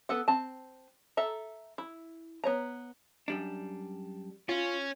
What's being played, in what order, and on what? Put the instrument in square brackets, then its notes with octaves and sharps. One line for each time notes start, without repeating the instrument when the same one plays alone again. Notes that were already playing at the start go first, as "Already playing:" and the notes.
[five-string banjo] B3 A4 F#5
C4 A5
A4 E5 A#5
E4
B3 C#5 A#5
[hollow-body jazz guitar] F#2 G3 D4
[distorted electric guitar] C#4 [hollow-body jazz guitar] F4